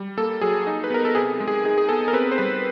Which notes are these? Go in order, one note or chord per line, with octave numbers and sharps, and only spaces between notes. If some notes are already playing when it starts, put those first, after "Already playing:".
Already playing: G3
A#3 A4
F#3 G#4
D#4
B4
B3 A#4
A4
C3 G#4
G#3
G#4
D#4 G#4
G#4
B3 A4
A#4
C4 B4
C5
G3 B4